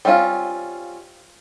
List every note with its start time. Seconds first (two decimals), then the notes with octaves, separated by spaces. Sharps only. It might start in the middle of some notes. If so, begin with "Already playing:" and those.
0.05 G3 C4 C#4 D#4 F4